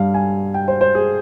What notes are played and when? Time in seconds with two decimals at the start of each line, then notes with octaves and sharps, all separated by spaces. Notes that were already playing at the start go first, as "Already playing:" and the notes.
Already playing: G2 G3 F5
0.14 G#5
0.54 G5
0.68 C5
0.81 C5
0.95 G#4